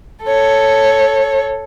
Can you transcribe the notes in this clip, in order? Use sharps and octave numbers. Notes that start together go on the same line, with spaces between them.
A4 C#5